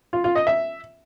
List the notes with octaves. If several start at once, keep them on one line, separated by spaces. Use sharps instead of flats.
F4
F4
D#5
E5